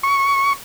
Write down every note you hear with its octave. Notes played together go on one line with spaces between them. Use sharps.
C#6